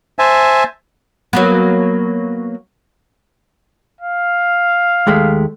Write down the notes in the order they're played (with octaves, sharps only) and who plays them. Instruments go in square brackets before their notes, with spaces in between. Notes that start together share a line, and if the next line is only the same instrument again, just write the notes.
[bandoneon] C5 E5 G#5 A5
[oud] F#3 A#3 B3
[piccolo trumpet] F5
[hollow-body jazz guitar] D#2 G#3 A3